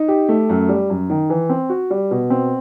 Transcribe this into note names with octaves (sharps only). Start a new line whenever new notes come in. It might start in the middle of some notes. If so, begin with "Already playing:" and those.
Already playing: D#4
G4
A3
F#2
G3
F#2
D#3
E3
C4
F#4
G3
B2
C4